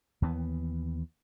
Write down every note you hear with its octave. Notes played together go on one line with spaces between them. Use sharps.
D#2 E3 B3